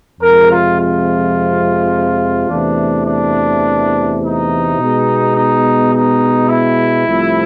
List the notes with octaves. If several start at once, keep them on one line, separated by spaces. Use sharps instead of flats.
F2 C3 F3 G#3 A#4
F4
F4
E2 C3 E3 A3 D4
D4
D#4
B2 G#3 B3
D#4
D#4
E4
C2 C3 F3 A3